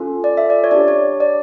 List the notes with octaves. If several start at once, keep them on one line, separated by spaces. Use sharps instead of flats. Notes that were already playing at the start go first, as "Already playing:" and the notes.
Already playing: C#4 F4 A4
D5
E5
D5
C#5
D4 G4 D5
C#5
D5